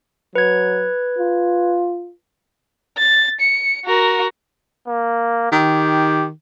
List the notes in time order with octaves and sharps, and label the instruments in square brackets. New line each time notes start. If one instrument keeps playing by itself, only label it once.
[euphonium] F#3 [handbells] B4 G#6
[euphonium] F4
[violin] A6
C#7
F#4 A#4
[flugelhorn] A#3
[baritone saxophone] D#3 [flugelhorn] G4